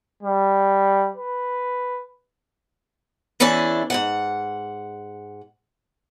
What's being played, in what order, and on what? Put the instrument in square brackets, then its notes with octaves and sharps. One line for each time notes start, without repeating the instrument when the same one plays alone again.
[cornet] G3
B4
[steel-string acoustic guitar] E2 E3 C#4 D4 E4 A5
G#2 C#3 F#5